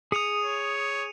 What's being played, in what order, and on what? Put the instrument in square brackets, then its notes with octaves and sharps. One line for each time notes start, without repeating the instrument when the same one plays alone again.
[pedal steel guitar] G#4 D#6 [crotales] C#7 D#7 F7
[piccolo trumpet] C#5